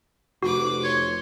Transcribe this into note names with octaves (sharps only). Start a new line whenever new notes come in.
F1 F#4 B4 D6
C#5 C6